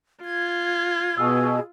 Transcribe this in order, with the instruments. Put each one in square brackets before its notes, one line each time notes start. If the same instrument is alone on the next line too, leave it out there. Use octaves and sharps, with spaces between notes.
[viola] F4 [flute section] G#6
[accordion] B2 [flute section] G#4 [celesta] E6